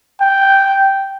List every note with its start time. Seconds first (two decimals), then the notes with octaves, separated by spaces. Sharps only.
0.21 G5